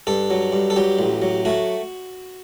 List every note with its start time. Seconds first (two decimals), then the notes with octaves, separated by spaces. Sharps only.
0.07 G2 A4
0.30 F#3
0.52 G2
0.70 A4
0.76 F#3 G4
0.99 A1
1.22 F#3
1.45 A3 F#4